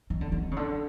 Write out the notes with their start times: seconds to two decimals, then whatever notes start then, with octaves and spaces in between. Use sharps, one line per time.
0.10 D#3
0.21 D3
0.32 D#3
0.51 C#3
0.57 D3